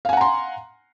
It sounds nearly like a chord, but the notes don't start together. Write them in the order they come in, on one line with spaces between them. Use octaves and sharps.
F5 G#5 F#5 A#5 C6